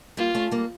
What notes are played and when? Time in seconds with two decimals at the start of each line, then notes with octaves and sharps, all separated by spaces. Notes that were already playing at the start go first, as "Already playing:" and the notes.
0.17 G3 A#3 F4
0.35 A3 C#4
0.51 G3 A#3